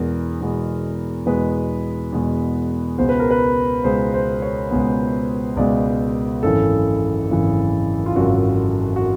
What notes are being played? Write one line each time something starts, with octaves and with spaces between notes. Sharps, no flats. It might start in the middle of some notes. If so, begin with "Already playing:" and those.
Already playing: E2 B2 G#3 B3 A#4
E2 B2 G#3 B3
E2 B2 G#3 B3 B4
E2 B2 G#3 B3
C#2 B2 G#3 B3 C5
B4
A#4
B4
C#2 B2 G#3 B3 C5
C5
C#5
C#2 B2 G#3 B3
C#2 B2 G#3 B3 D5
G#1 F#2 C#3 E3 A4
G#1 F#2 C#3 E3
F4
G#1 F#2 C#3 E3 F#4
F#4